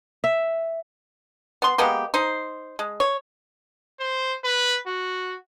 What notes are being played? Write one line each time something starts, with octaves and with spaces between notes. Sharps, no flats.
E5
B3 C6
G#3 A#3 B3 G4
D#4 C5
G#3
C#5
C5
B4
F#4